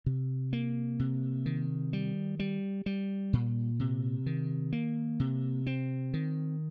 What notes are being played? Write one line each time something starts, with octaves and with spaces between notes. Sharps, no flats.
C3
A#3
C3
D#3
G3
G3
G3
A#2
C3
D#3
A#3
C3
C4
D#3